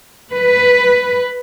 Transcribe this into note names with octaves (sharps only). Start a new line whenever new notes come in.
B4